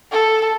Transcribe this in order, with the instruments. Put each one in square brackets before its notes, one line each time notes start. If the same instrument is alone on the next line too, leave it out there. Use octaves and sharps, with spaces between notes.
[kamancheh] A4